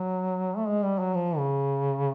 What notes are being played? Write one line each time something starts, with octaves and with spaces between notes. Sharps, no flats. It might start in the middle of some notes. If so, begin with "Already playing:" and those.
Already playing: F#3
A3
G#3
G3
F#3
F3
C#3